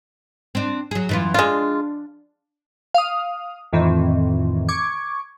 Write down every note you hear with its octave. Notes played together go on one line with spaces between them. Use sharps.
C4 D4
F#3 G#4
F#2 E3 F4
G#3 D4 F4
F5 D#6
F2 A2 D#3 E3 C4
C#6 D6 G#6